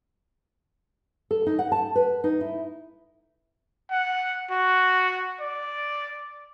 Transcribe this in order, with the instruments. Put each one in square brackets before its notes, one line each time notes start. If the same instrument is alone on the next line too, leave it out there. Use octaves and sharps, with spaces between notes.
[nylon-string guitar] A4
D#4
F#5
A5
B4
D#4
E4
[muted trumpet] F#5
F#4
D5